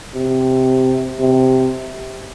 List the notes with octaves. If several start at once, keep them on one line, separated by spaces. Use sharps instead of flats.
C3
C3